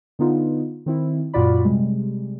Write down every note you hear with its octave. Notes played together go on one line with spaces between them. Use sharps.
D3 B3 D#4 F4
D#3 C4 E4
F#2 A#2 F4 F#4 D5 B5
C3 G3 G#3